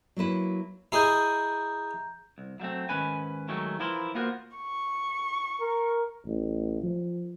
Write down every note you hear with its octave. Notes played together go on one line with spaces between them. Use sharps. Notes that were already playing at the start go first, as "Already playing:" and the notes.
F#3 A#3 E4 B4
E4 G#4 D#5 A#5 G6
C2
F#3 G3 A3 C4
G#2 D#3 C#4 B4 G#5
D#3 F#3 G#3 A3
E3 F3 E4 A#4 C6
A#3 B3 F4 F#4 A#4 C5
C#6
A#4
A1
F3